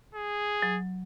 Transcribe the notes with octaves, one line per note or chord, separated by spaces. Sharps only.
G#4
F#3